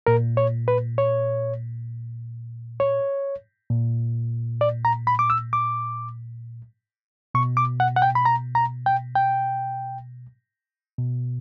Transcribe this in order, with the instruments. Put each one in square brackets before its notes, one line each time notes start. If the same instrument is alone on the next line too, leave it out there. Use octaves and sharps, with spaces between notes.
[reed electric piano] A#2 A#4
C#5
B4
C#5
C#5
A#2
D5
A#5
B5
D6
E6
D6
B2 C#6
D6
F#5
F#5
G5
B5
A#5
A#5
G5
G5
B2